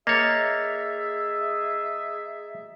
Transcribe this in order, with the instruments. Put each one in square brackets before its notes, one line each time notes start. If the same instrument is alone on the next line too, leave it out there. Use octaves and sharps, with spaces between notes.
[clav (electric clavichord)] A#3 C#5 [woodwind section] G#4 E5 [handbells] D#5 A#5 A6